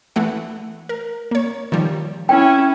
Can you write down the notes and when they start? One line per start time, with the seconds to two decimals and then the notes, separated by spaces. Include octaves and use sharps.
0.16 E3 A3 F#5
0.89 A#4
1.31 A#3 C#5
1.72 D#3 F3 G3
2.29 C#4 E4 G5